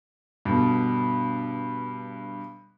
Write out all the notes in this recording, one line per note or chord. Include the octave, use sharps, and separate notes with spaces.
G2 B2 D3